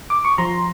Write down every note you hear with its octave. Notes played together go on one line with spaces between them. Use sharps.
D6
C#6
F3 A#5 C6